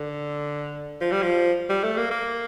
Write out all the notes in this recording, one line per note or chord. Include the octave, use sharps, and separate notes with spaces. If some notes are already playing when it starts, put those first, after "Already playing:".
Already playing: D3
F3
G3
F3
G3
A3
A#3
A#3